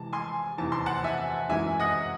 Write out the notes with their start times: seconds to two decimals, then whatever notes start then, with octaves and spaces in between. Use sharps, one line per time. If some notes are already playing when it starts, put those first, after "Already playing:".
Already playing: C3 E3 G#3 A5
0.13 G#5 C6
0.58 E2 C3 E3 A5
0.72 C6
0.86 F#5 A5
1.04 E5 G#5
1.50 F#2 E3 G#3 E5 G#5
1.80 D#5 F#5